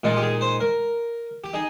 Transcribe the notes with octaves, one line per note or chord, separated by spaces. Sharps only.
A#2 G#3 D#4 F4
G4
G#4
C5
A#4
G4
D#4 G#4